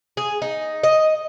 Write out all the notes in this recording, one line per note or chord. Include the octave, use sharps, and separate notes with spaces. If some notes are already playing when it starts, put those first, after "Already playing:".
G#4
D#4
D#5